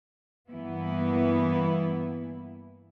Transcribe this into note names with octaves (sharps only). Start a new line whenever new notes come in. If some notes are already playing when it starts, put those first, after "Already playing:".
G2 E3 A#3 B3 E4